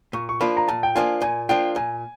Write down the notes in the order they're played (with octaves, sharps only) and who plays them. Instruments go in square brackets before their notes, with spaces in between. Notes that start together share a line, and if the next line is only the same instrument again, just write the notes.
[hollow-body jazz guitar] A#2 [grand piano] C#6
[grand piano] C#6
[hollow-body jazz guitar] F3 A#3 D4 F4 [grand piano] B5
[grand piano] A#5
[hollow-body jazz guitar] A#2 [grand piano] A5
[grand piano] G5
[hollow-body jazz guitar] F3 A#3 D4 F4 [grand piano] G#5
[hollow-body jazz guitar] A#2 [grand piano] G#5
[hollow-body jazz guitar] F3 A#3 D4 F4 [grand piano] G5
[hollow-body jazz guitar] A#2 [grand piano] G#5